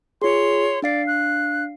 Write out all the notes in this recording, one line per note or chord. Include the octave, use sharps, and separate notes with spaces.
F4 G#4 C#5 C6
D4 D5 F5 C7
F#6